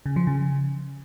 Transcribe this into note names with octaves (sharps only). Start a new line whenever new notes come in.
C#3
F3
C#3